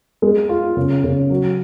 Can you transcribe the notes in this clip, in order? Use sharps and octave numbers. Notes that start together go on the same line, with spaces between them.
G#3
F4
C#3
C#3
F#3